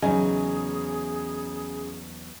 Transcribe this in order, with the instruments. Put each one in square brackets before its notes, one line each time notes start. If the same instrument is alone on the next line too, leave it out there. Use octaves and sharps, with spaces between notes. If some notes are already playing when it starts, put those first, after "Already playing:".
[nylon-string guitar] E2 F#3 C#4 [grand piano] C#3 D#4 G#5 [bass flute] G#4